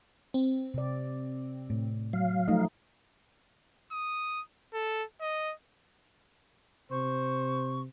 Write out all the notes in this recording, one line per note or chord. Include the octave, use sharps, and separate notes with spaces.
C4
C3 D5
A2
F#3 F5
F3 A3 D#4 D#5
D#6
A4
D#5
C3 C5 C#6